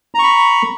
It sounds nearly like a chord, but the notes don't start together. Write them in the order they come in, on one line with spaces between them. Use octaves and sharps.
A#5 C#6 B5